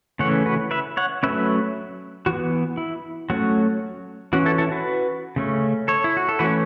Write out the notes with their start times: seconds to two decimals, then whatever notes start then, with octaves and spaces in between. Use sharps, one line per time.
0.19 C#3 E3 A3 C#4 C#5 F#5
0.46 F#4 B4
0.71 B4 E5
0.97 C#5 F#5
1.23 F#3 A3 C#4 B4 E5
2.26 E3 F#4
2.31 B3
2.77 E4
3.30 F#3 A3 C#4 F#4
4.33 E3 C#4 F#4
4.46 E4 A4
4.58 E4 A4
4.71 F#4 B4
5.36 C#3 A3 C#4
5.88 A4 C#5
6.04 E4
6.17 F#4
6.29 A4
6.39 E3 A3 C#4 F#4 B4